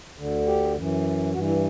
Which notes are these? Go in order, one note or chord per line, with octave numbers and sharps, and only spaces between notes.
D2 D3
G4
F#2 E3
G2 E3 F#4
E4